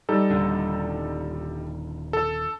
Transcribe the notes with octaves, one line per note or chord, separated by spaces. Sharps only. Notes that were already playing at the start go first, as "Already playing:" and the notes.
G3 D#4 A4
D#1 D3
A4